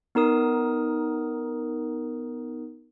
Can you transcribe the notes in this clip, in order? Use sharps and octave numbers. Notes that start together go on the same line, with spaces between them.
B3 D#4 A#4 D#6